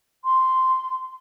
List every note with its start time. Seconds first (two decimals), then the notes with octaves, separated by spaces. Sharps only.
0.24 C6